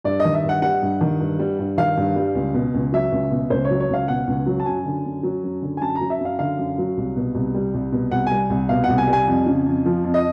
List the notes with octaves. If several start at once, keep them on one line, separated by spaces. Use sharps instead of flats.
G2 D5
D#5
D#3
E5
G2
F#5
G3 F#5
G2
D#3
G2
G3
G2
D#3 F5
G2
G3
C#2
B2
C#2
F#3 E5
C#2
B2
C#2 C5
C#5
F#3
C#5
C#2 F5
B2 F#5
C#2
F#3
A5
F#2 G#5
D3
F#2
F#3
F#2
D3
G#5
F#2 A5
A#5
F#3
E5
F#2
F5
D3 F5
F#2
F#3
C2
B2
C2
G3
C2
B2
C2 F#5
G3 G#5
C2
B2 F5
F#5
C2
G#5
G3
G#5
F2
C#3
F2
F3
F2
D#5